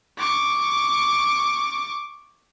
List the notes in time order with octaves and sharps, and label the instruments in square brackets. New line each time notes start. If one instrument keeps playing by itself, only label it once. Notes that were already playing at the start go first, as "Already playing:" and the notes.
[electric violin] C#6 D6